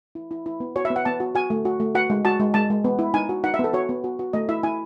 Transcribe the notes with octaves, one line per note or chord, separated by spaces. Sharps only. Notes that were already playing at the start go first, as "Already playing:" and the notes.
E4
E4
E4
B3
F#4 C#5
E5
B3
F#5
B3 A5
F#4
F#4 G#5
A3
F#4
A3
F#4 F#5
G#3
F#4 A5
G#3
G#3 A5
G#3
B3
E4
D#4 G#5
F#4
D#4 F#5
E5
B3
A4
F#4 C#5
B3
F#4
F#4
A3 D#5
E4 E5
E4 G#5